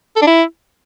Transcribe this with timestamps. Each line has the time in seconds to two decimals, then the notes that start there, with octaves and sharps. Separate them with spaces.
0.16 A4
0.22 D4
0.27 E4